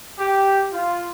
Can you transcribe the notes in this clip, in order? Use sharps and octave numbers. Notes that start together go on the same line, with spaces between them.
G4
F4